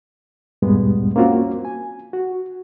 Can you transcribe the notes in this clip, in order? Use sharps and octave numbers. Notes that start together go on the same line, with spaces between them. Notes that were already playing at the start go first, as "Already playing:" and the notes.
D2 G2 A#2 G3 G#3 B3
A#3 C4 C#4 F4 F#4
G#5
F#4